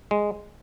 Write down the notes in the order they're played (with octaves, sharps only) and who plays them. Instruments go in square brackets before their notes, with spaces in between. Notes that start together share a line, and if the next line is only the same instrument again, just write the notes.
[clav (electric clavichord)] G#3